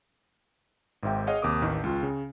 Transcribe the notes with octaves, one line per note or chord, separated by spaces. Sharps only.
G#1 G#2 E5 G5
G#4 C#5 D#5 F5 F#5
D#2 C3 A#4 D6 D#6
A1 D#3 E3
C#2 F4
C#3